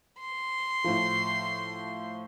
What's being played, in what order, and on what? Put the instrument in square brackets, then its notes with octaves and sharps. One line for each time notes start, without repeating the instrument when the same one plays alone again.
[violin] C6
[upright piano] A2 F3